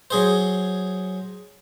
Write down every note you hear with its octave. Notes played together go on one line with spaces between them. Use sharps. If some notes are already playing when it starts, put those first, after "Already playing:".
F#3 G#4 C5